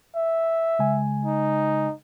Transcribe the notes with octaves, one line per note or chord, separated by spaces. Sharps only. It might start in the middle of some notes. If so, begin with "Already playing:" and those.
E5
C#3 G#3 G#5
D#4